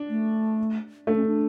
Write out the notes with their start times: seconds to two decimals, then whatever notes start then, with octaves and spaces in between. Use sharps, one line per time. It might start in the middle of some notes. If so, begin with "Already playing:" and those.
Already playing: D4
0.09 A3
1.07 A3 D4
1.16 C#4
1.26 D4